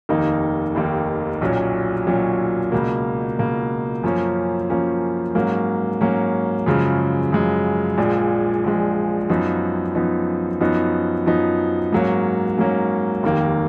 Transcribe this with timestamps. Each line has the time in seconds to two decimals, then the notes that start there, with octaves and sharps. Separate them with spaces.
0.09 F1 D#2 D#3 A#3 D#4
0.75 F1 D#2 D#3 A#3 D#4
1.41 B1 A#2 F#3 C#4
2.07 B1 A#2 F#3 C#4
2.72 C#2 B2 A#3
3.38 C#2 B2 A#3
4.04 F#2 F3 A#3 C#4
4.70 F#2 F3 A#3 C#4
5.35 G#2 F#3 A#3 C#4
6.01 G#2 F#3 A#3 C#4
6.66 F#2 C#3 F3 G#3
7.32 F#2 C#3 F3 G#3
7.98 A#1 A#2 F3 G#3
8.64 A#1 A#2 F3 G#3
9.29 F#2 F3 B3 D#4
9.95 F#2 F3 B3 D#4
10.61 F#2 F3 B3 D#4
11.26 F#2 F3 B3 D#4
11.93 G#2 F#3 A#3 C#4
12.58 G#2 F#3 A#3 C#4
13.23 F1 D#2 D#3 A#3